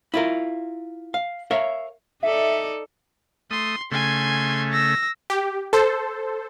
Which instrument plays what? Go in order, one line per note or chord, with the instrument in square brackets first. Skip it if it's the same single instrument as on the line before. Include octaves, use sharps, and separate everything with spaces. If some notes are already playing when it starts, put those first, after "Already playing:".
[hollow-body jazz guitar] E4 F4 A#4
F5
A#4 C#5 E5 F5
[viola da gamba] D#4 A4 D5 [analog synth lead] E5
[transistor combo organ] A3 D#6 [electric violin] C6
[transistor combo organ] C#3 A3 [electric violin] G#5 C6
[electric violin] E6 A#6
[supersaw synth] G4
A4 C5